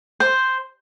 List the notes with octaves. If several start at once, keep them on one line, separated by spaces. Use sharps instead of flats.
C5